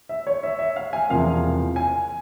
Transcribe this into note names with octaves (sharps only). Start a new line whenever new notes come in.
E5
C#5
E5
E5
F5
G#5
E1 E2 C3 F3 A#3 F5
G#5